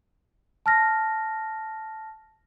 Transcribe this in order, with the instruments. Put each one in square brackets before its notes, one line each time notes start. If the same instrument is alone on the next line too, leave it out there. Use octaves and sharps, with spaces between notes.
[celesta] A5 F6 A#6